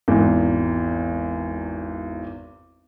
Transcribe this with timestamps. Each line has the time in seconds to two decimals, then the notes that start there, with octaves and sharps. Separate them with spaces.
0.08 G#1 E2